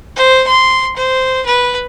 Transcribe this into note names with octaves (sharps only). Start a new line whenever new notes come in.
C5
C6
C5
B4